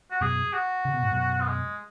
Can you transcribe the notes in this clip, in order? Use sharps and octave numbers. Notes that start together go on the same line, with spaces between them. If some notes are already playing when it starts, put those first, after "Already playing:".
F#4
F#2 B2 G#4
F#4
C#3
B2
G#2
F#2 B2
B3
G#3